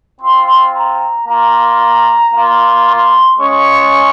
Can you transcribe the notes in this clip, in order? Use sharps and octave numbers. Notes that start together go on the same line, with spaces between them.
C4 F4 C6
A#5
A#3 F4 A#5
A#3 F4
C6
G#3 C#4 F4 C#6